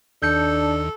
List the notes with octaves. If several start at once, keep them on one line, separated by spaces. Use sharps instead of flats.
D#2 D4 A4 G6 C#7